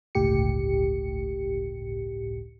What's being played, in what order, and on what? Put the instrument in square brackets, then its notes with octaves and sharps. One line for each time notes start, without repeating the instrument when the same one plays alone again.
[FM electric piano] G1 C#2 A2 G4 C#7